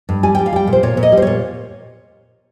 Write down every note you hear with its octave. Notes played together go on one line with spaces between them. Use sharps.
G2
G3 G#5
G3 G5
F5
G3 G5
A#2
C5
A#2 C#5
A#2
D#5
G3
C5
A#2 C#5